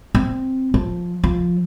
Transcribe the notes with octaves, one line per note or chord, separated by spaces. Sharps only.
C4
F3
F3